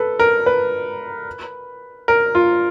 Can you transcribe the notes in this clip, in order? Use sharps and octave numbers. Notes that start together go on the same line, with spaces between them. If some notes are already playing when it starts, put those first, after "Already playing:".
Already playing: A4 B4
A#4
B4
A#4
F4